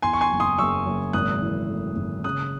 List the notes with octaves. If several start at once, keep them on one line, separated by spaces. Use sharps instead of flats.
E2 G#5 C6
C#6
G#5 C6
F#1
C6 D#6
F#1 C#6 E6
F#1
G#1 D#6 F#6
E3
A3
G#1
C#3 D#6 F#6